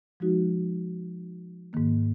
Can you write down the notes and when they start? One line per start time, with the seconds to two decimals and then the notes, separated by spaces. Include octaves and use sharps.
0.20 F3 G#3 D#4 F#4
1.73 G#2 D#3 A#3